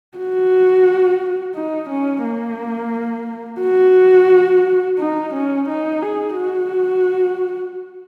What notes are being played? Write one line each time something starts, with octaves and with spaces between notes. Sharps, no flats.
F#4
D#4
C#4
A#3
F#4
D#4
C#4
D#4
G#4
F#4